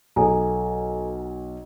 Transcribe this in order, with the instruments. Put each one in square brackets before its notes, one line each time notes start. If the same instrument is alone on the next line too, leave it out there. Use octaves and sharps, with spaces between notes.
[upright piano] B1 [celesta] A4 G#5 A#5